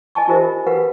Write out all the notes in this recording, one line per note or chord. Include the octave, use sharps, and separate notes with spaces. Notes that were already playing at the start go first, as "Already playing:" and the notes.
D#5 G#5 A5 C#6
D#4 F4 G4 A#4 C5 E5
F#4 G4 A#4 B4 F5 F#5